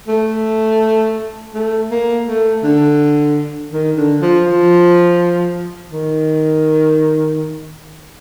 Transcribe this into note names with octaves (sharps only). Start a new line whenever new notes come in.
A3
A3
A#3
A3
D3
D#3
D3
F3
F3
D#3